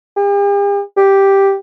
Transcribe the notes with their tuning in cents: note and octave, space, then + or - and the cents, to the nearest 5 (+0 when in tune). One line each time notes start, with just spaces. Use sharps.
G4 +45
G4 +0